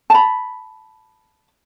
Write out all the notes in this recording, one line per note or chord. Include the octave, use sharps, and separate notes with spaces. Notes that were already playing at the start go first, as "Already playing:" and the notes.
A5 B5